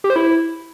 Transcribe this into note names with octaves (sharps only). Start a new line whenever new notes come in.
G4
C5
E4